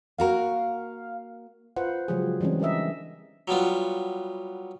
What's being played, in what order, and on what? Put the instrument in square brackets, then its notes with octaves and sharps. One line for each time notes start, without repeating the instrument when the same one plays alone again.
[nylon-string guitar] A#3 F#4 A#4 [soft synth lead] F5
[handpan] F4 B4 C5 F#5
C#3 F3 F#3 G#3 G4 G#4
E3 G3 G#3 C4 C#4
D4 G4 A#4 D#5 E5
[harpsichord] F#3 G3 B3 F4